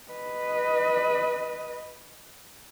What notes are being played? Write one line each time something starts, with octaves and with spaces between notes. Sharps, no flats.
B4 D#5